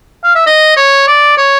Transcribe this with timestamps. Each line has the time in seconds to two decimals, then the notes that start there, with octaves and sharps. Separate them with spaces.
0.24 F5
0.35 E5
0.46 D#5
0.77 C#5
1.07 D5
1.37 C#5